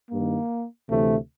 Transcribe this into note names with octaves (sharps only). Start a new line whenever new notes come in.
G2 D#3 A#3
D2 C3 E3 A3